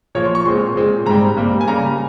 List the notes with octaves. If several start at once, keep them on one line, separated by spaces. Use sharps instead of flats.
A#2 F3 A#3 C#5
C6
C#6
A#2 G#3 C4 C6
A#2 G#3 C4
G#2 G3 C4 A#5
G2 G3 A#3
G#5
C#3 G3 A#3 A#5